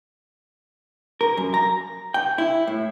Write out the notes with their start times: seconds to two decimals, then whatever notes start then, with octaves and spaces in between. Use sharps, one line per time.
1.21 A#4
1.37 F#2
1.54 A#5
2.14 G5
2.38 E4
2.67 A2